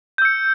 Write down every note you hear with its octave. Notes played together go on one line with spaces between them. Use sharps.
E6 G6 C#7